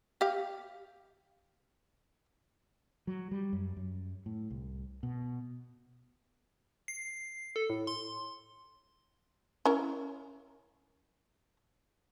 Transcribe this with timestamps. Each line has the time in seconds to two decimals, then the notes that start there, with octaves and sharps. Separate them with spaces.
0.21 G4 F5
3.07 F#3
3.31 G3
3.53 F#2
3.77 F#2
4.26 A2
4.50 C2
5.03 B2
6.88 C7
7.56 A4
7.70 A2
7.87 C6
9.65 C#4 E4 A#4